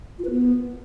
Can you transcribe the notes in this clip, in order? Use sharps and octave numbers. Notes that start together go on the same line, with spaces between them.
F4
B4
B3